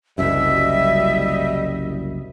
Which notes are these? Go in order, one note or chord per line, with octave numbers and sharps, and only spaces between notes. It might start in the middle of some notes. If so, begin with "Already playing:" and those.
F#1 C2 F#2 G3 D#5 E5